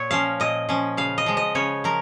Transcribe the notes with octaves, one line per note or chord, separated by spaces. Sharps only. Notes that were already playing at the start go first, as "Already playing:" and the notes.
Already playing: A#2 C#5
F3 C#4 F5
A#2 D#5
F3 C#4
C#3 F5
D#5
F3 G#3
D#5
C#3 C#5
F3 A#4